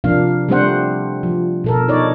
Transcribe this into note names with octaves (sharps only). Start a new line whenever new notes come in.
C3 F3 A#3 D4 F5
G3 A3 C4 D4 C5 F#5
F3
B2 A4 A#4
D#4 C#5 D5